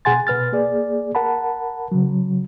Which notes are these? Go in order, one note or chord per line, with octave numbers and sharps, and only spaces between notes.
B2 G#4 F#5 G#5 C6 A6
B2 B4 F6 A6
A#3 G#4 D5
A#4 F#5 A5 B5
C#3 F#3